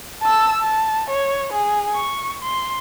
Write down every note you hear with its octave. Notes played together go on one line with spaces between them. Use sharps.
A5 E6
A5
C#5
G#4
C#6
C6